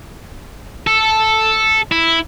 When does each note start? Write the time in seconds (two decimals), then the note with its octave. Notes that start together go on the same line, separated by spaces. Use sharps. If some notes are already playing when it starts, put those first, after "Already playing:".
0.87 A4
1.91 E4